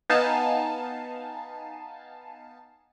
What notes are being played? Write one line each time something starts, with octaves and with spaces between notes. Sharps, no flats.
B3 D#4 F5 G#5 A5